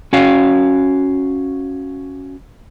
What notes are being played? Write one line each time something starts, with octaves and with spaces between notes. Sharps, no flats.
C#4 F#4 C#5 F5